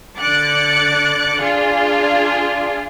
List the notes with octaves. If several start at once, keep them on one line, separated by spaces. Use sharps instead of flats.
D3 D6 F#6 A6 C#7
D4 F4 G#4